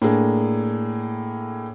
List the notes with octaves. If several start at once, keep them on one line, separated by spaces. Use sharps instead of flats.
A2 A#3 D4 G#4